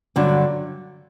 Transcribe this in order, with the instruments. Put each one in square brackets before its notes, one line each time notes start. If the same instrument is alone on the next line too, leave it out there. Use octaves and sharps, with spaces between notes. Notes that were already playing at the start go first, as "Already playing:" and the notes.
[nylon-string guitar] G2 D3 F#3